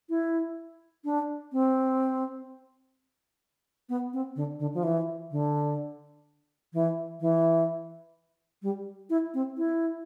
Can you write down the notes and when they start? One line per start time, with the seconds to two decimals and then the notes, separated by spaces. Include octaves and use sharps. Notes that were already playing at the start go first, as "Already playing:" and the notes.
0.10 E4
1.05 D4
1.53 C4
3.89 B3
4.13 C4
4.36 D3
4.59 D3
4.74 F3
4.83 E3
5.31 D3
6.73 E3
7.21 E3
8.62 G3
9.10 E4
9.34 C4
9.58 E4